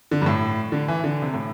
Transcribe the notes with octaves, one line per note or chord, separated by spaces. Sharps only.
D3
G2
A2
D3
E3
D3
C3
A2